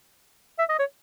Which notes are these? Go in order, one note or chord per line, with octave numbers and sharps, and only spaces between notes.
E5
D#5
C#5